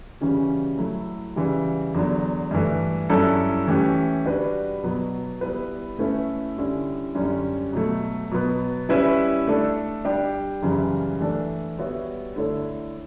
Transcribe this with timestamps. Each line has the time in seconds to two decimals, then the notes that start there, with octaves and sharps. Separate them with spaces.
0.21 C#3 E3 G3 C#4 F#4
0.78 F#3 A3 E4
1.36 C#3 E3 G3
1.94 E2 D3 F#3
2.51 G2 E3 A3
3.09 G2 F#3 C#4 E4 A4
3.67 E3 A3 C#4 G4
4.26 G3 D4 F#4 B4 D5
4.83 B2 F#3 B3
5.41 G3 B3 E4 B4
5.99 A3 C#4 E4 B4 E5
6.57 D3 G3 C#4 E4
7.15 F#2 D3 G3 C#4
7.73 B2 F#3 A3
8.31 B2 F#3 B3
8.89 G3 C#4 E4 B4 E5
9.47 A3 D4 A4
10.05 G3 D4 G4
10.63 F#2 C#3 E3 G3
11.20 E3 A3 D4 A4
11.78 G3 B3 F#4 C#5 E5
12.36 D3 A3 E4 A4 C#5